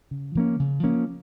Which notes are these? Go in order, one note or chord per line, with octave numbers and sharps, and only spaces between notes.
C#3
F3 A#3 C#4
C#3
F3 A#3 C#4